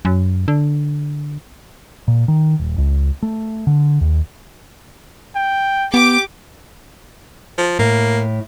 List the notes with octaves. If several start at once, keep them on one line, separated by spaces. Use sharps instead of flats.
F#2
D3
A#2
D#3
D#1
C#2
A3
D3
D#2
G5
B3 G4 D6
F3
A2 A#3